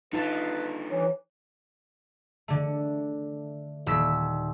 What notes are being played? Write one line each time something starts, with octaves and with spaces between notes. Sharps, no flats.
D3 D#4 F4 B4 A5
E3 C#5
D3 A3
D#1 E6 B6